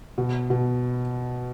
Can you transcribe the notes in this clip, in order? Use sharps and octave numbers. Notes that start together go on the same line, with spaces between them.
B2
B2